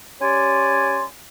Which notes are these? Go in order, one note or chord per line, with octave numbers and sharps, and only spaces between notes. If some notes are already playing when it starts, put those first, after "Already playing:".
C#4 G4 C#5 D5 G#5 C6